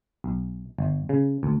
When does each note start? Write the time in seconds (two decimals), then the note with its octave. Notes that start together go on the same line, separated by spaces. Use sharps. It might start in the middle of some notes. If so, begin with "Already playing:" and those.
0.24 B1
0.78 G1
1.09 C#3
1.43 D2